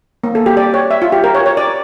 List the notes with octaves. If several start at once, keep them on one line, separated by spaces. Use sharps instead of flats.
A#3
A4
G4
D5
C#5
E5
F4
G4
A#4
C#5
C#5
D5